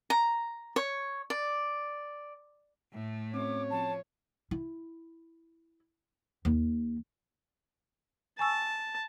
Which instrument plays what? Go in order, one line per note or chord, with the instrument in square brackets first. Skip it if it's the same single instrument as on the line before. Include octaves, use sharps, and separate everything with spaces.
[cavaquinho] A#5
C#5
D5
[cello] A2 A3
[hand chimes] C4 C#4 F#4 [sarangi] C#5 [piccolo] D6
[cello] F3 [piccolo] A5
[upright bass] E4
D#2
[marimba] G#5 C#6 E6 [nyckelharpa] A5